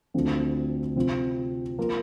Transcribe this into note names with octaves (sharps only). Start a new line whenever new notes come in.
D2 D3 F3 C4
C3 F3 C4 F4
F3 A#3 F4